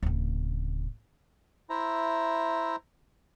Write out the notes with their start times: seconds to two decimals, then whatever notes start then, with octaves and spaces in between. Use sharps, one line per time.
0.03 D1 C#3
1.70 E4 C5 E5 A#5